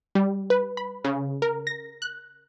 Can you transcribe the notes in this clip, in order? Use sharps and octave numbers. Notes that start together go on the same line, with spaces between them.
G3
B4
B5
C#3
A#4
A#6
F#6